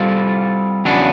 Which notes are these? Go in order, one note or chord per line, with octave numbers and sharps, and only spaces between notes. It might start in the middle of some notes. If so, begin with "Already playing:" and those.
Already playing: G3 C4 F4 A4
E2 C#3 F#3 B3 D4